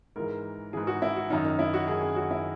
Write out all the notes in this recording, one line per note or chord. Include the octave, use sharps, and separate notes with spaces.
G#2 E3 A#4
G#2 E3 G#4
F#4
E4
F#4
F#2 D#3 D#4
D#4
E4
F#4
F#2 D#3 G#4
G#4
F#4
E4